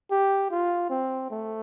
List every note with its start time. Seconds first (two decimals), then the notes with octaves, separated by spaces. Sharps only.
0.11 G4
0.51 F4
0.90 C4
1.30 A3